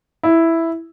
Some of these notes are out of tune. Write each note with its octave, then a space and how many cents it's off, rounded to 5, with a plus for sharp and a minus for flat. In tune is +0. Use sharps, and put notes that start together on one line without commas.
E4 +0